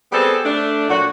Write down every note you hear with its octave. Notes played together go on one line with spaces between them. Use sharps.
G3 B3 C4 G#4 A4
A3 D4
A#2 F#3 F#4